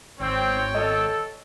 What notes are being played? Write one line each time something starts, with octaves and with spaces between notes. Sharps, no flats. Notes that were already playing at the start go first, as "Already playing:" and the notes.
G#1 C4 C#5 G5
A4 D#5